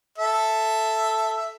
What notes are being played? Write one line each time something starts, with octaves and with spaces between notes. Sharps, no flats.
A4 E5